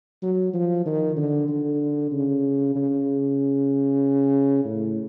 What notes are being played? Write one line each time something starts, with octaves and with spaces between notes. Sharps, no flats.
F#3
F3
D#3
D3
D3
C#3
C#3
A2